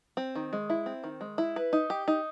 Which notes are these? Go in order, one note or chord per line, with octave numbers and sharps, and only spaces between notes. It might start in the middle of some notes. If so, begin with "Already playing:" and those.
C4
D#3
G#3
E4
C4
D#3
G#3
E4
B4
D#4
G4
D#4